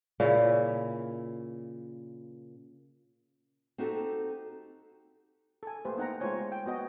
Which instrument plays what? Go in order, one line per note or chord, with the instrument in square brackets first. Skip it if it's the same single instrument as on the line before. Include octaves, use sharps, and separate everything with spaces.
[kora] A#2 C#3 E4
[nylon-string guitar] C4 D#4 F#4 G4 A4
[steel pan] A4 G#5
A3 A#3 G4 B4 C5
B3 D#4 F#5 G5 A#5
G#3 A3 F4 C5 C#5 G#5
G5
A#3 B3 F#4 D#5